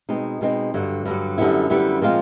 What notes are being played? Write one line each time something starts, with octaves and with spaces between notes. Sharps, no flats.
B2 G#3 C4 D#4
B2 G#3 C4 D#4
G2 D3 F#3
G2 D3 F#3
F#2 D3 G3 B3 E4
F#2 D3 G3 B3 E4
A#2 F3 G#3 C4 F4